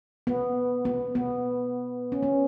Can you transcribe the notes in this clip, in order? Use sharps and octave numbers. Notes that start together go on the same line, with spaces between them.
B3
B3
B3
C#4
B3